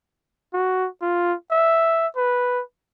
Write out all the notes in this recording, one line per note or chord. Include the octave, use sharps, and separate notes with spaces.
F#4
F4
E5
B4